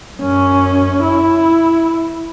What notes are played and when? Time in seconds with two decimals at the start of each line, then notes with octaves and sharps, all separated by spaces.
0.18 F#2 C#4
1.03 E4